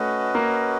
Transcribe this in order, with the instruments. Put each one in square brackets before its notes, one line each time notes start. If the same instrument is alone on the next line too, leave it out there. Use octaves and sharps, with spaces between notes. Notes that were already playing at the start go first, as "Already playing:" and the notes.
Already playing: [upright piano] A3 [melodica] C#4 F#4 B4 D#5
[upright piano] A#3